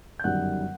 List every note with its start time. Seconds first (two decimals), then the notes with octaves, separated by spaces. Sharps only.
0.19 G6
0.24 G1 F#2 D#3 G3 F#5 F#6